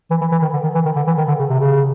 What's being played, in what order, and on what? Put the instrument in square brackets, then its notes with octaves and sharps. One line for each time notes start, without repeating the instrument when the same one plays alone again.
[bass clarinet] E3
E3
E3
D#3
D3
D#3
E3
D#3
D3
E3
D#3
D3
C#3
C3
C#3